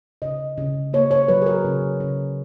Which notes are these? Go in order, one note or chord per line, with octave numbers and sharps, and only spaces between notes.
C#3 D#5
C#3
A#3 C#5
C#5
F#3 B4
G#4
A#4
C#3
C#3